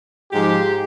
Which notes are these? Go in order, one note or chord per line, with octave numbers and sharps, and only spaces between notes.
G#2 F3 G#3 G4